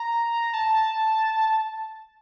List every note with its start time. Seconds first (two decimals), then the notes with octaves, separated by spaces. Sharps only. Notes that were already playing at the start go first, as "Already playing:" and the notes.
Already playing: A#5
0.54 A5